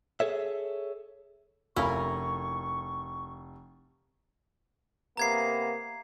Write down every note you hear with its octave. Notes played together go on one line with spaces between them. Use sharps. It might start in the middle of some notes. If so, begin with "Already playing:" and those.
G#4 A4 C#5 E5
F1 C#4 E4 F4 A#4 C#6
C3 A#3 B3 A#5 G#6 C7